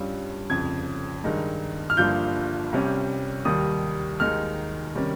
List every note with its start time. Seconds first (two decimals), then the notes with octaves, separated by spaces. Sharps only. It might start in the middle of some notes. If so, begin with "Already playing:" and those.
Already playing: G2 G3 C#4 F4
0.50 F1 F2 C#3 G#6
1.24 G2 D#3 G#3 D#4
1.90 F6
1.97 G1 G2 F3 A#3 F4 G6
2.72 C2 C3 G3 C#4
3.45 D#2 D#3 G3 D#6
4.20 D#2 D#3 G#3 D#4 F6
4.95 C3 D#3 G3 C#4